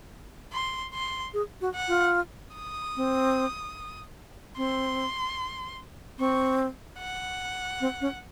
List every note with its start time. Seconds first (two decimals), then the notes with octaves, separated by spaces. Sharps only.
0.53 C6
0.94 C6
1.34 G#4
1.61 F#4
1.75 F#5
1.88 F4
2.56 D#6
2.97 C4
4.57 C4 C6
6.19 C4 C#6
7.00 F#5
7.81 C4
8.01 C#4